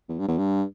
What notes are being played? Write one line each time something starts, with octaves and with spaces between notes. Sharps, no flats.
E2
G2
E2
G2